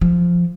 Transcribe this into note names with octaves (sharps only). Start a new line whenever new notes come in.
F3